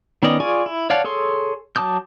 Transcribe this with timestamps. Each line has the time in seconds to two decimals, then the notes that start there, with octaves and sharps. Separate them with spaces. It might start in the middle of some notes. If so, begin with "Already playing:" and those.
0.23 D#3 B3 C#4 D5 D#5
0.40 F4 G#4 D5 G#5 C#6
0.66 E4
0.90 C#5 D5 F5 F#5 A5
1.04 G#4 A4 C#5 C6
1.76 F#3 A5 D6 D#6 G6